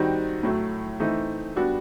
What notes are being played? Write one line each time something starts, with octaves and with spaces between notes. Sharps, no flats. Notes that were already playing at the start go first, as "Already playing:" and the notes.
Already playing: D#3 G3 C4 D#4 F#4
A2 F#3 A3
E3 A3 C4 D#4
G3 B3 D4 F#4